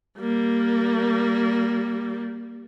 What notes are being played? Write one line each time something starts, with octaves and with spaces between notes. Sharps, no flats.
G3 A#3